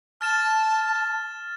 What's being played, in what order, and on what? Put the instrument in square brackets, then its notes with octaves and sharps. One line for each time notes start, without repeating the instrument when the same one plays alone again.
[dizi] A5 [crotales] F6 A6 E7